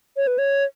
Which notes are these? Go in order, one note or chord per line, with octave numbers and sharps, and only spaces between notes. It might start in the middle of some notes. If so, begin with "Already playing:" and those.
C#5
B4
C#5